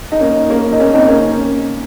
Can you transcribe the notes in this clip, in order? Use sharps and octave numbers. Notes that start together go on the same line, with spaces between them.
D#4
A#3 C#4
A#3 C#4
D#4
A#3 C#4
C4 D#4
A#3 C#4